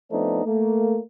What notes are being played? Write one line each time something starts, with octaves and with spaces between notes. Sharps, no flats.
F3 A3 B3 C4 D4 D#4
A3 A#3